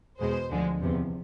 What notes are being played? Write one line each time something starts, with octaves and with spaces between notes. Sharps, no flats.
E2 B2 G#3 C5
D2 D3 F3 G#3
E2 C3 F3